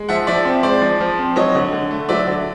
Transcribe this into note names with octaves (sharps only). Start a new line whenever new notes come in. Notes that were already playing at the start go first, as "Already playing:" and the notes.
Already playing: G#3
F3 E5 F#5
F3 D5 E5
C4
G#3 C5 D5
F3
F3
C4
F#3 C#5 D#5
D3
D3
A3
F#3 D5 E5
D3